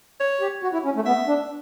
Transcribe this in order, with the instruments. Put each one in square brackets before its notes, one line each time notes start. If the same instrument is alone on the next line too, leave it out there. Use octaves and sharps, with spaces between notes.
[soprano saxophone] C#5
[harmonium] G4
F#4
E4
C#4
A3
[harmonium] B3 [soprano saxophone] E5
[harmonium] D4